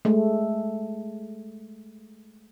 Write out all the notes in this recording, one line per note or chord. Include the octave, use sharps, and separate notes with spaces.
G#3 A3